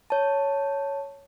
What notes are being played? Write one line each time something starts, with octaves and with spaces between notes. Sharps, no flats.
C#5 A5